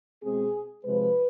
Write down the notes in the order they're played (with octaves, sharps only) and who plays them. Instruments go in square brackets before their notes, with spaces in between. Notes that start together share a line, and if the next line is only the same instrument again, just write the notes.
[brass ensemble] B2 G#3 C4 G#4
C3 F3 G#3 B4